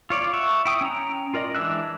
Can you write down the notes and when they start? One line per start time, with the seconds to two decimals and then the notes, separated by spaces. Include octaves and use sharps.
0.10 F4 C#5 D5
0.33 E5 F#5 C#6
0.65 E4 G5 D#6
0.81 C#4 G5 A#5
1.34 F4 A#4 D5 D#5
1.55 E3 G#3 D4 E5 F#6